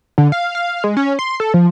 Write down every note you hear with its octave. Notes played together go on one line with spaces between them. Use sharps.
D3
F5
F5
G#3
C#4
C6
A4
F3